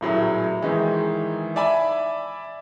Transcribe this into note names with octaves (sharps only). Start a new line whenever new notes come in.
D#1 A2 F#3 G#4
G#2 D#3 E3 G#3
D5 E5 G#5 B5